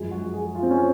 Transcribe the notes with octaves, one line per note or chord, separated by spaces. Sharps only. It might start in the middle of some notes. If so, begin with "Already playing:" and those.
Already playing: F#2 F3 G#3
F#4
G#4
F4
C4
C#4